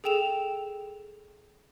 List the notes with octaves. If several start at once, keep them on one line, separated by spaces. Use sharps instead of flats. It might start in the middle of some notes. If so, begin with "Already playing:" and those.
G#4 A4 G5 E7 F7